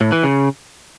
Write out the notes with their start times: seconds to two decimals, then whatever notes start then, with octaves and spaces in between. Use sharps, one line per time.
0.01 A2
0.12 E3
0.23 C#3